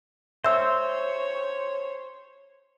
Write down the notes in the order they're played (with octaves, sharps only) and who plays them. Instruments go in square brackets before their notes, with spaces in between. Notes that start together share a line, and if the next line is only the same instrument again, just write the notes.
[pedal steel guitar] C5 [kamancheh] C#5 [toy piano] E5 E6